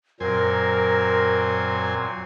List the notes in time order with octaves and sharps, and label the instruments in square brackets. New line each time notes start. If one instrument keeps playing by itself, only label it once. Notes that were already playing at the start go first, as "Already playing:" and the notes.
[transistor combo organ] F#2 C5 G#5 [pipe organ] A#2 F#3 C4 [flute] A#4